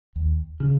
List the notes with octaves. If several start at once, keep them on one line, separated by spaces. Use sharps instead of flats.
D#2
C#3